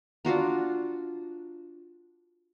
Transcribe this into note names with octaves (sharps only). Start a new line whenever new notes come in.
D4 F4 F#4 A#5